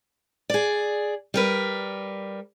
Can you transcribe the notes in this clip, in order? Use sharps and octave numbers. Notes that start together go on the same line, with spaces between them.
G#4 D5
G3 A#4 B4